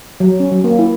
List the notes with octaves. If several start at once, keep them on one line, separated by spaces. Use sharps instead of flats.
F#3
C#4
F#3
A#3
E4